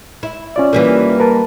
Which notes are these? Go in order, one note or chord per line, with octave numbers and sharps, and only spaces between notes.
E4
C#4 F4 D5
E3 G3 A#3
A#4 B4 A5